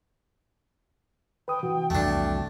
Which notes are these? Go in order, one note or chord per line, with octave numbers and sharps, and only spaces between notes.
B4 G5 D#6
C3 E3 F#4
C2 F2 A3 D4